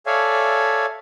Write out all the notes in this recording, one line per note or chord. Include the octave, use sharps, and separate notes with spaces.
A4 C#5 D5 E5 F5 G#5